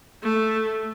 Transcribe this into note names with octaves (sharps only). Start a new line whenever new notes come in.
A3